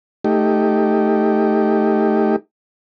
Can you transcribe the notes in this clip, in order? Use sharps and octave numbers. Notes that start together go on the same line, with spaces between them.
A3 D#4 G4